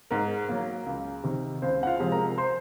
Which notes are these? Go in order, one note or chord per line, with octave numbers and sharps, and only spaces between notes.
G#2 A#4
F#3 A#3
C#2
C3 D#3
C#2 C4 C5
F#5
F4 F5
C3 F3 G#3
A#4 A#5
C5 C6